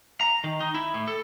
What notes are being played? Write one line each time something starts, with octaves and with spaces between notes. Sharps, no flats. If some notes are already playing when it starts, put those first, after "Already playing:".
A#5
D#3
D#4
E4
A2
A4